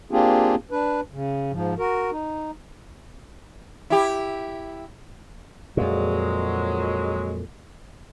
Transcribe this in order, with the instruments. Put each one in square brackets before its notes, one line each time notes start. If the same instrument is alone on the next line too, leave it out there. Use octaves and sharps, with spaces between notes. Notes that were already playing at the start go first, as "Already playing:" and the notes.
[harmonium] A#3 C4 D4 F4 G4 G#4
D4 B4
C#3
G#2 F3
F#4 A#4
D#4
[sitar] E4 G4
[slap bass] F2 A#2 [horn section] F#3 G#3